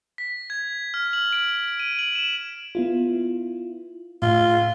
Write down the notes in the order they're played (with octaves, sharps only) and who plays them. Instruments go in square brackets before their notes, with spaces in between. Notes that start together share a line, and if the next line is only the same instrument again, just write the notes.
[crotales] B6
G#6
F6
F#7
D7
D#7
F#7
E7
[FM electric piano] B3 E4 F4
[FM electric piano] A2 [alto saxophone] F4